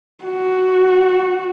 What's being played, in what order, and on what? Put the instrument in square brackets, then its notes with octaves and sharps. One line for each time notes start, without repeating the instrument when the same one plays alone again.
[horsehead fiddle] F#4